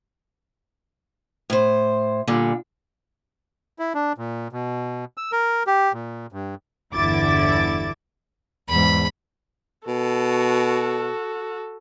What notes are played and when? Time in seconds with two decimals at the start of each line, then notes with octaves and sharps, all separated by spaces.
1.50 A2 C5
2.27 A#2 D3 G3
3.79 E4
3.94 D4
4.18 A#2
4.52 B2
5.17 E6
5.32 A#4
5.67 G4
5.93 A#2
6.32 G2
6.94 G1 E2 D3 E4 D6 A6
8.69 E2 G#2 B5
9.87 B2 F#4 A4